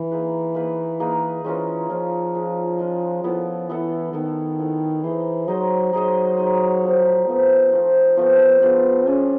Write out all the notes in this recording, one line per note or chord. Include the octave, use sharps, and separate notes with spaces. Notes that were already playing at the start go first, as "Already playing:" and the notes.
Already playing: E3
A#3 D#4 G#4 B4
A#3 D#4 G#4 B4
A#3 D#4 G#4 B4
E3 G#3 C#4 F4 A#4
F3 G#3 C#4 F4 A#4
G#3 C#4 F4 A#4
G#3 C#4 F4 A#4
F3 B3 E4 A4
E3 B3 E4 A4
D#3 B3 E4 A4
B3 E4 A4
E3 D#4 G#4 C5 D#5
F#3 D#4 G#4 C5 D#5
F#3 D#4 G#4 C5 D#5
D#4 G#4 C5 D#5
F3 A3 C4
F3 A3 B3 C4
F3 A3 C4
F3 A3 B3 C4
B3 D4 F4 G#4
C#4 D4 F4 G#4